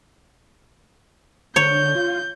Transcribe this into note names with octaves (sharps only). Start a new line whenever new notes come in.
D3 C#5 G6
F4